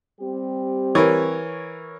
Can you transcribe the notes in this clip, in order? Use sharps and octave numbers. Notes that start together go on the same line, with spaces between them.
G3 C4 G4
E3 A#4 C#5